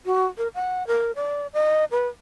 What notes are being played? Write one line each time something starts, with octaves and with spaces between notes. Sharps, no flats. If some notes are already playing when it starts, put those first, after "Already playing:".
F#4
A#4
F#5
A#4
D5
D#5
B4